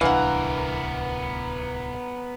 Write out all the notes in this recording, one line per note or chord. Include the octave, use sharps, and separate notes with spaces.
D1 C2 E3 B3 D4 A#4 F5 F#5